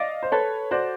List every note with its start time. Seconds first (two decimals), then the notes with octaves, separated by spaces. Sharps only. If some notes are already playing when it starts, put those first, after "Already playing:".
Already playing: D5 D#5 F5
0.23 C5
0.32 A4 B4 C#5
0.71 F#4 C5 D5